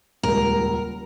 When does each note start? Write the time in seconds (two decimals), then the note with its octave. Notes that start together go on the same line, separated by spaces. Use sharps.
0.23 D#1 C#2 A#4